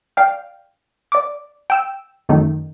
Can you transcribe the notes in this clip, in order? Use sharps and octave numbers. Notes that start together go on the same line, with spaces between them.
D5 F5 G5 F6
D5 D6
G5 E6 E7
F#2 D#3 A3 D#4